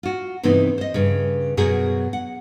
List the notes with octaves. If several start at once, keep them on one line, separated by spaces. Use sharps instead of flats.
F4 F#4
G2 C3 E3 B3 C4 D#4
C5 D#5
G2 C#3
F#2 B2 F#4 G#4
F#5